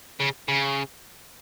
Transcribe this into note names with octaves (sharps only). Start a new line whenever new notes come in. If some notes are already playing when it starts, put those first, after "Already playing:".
C#3
C#3